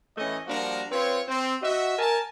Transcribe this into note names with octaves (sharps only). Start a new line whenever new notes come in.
A2 E3 A3 C#4 D#5
F3 G3 A#3 D4 F#4 A#4
C4 F4 B4 C#5
C4
F#4 D#5 E5
A#4 G#5 A5